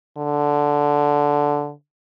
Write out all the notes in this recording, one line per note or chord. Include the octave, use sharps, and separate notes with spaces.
D3